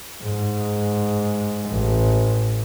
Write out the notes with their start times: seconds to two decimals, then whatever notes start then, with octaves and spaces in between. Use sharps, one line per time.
0.23 G#2
1.70 A1